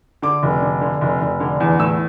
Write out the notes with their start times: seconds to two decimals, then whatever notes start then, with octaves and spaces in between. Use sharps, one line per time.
0.22 D3 D6
0.43 F1
0.62 D3
0.81 D3
1.01 F1
1.21 F1
1.40 D3
1.60 E2
1.79 A2 E6